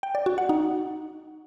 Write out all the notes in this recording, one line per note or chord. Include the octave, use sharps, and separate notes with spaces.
G5
D5
F#4
F#5
D#4